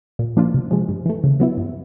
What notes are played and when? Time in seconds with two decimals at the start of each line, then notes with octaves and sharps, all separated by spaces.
0.19 A#2
0.37 F3 A#3 D4 F4
0.54 C3
0.71 F3 G#3
0.88 G2
1.06 E3 A3
1.24 C#3
1.40 F#3 B3 E4
1.57 G2